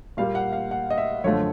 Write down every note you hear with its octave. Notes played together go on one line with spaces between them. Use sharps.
A#2 G3 A#3 F5
F#5
F5
F#5
D#5
E5
F#2 D3 F3 A3 C#5